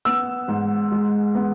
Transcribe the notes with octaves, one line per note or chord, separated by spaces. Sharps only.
B3 E6
G#2
G#3
B3